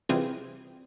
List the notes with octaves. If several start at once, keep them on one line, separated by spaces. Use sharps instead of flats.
C3 E3 G3 C4 F4 G#4